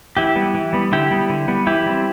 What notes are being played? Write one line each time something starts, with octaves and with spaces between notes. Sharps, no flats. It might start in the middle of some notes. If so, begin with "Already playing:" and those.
E3 E4 G4
G3 B3
E3
G3 B3
D3 E4 G4
G3 B3
D3
G3 B3
E3 E4 G4
G3 C4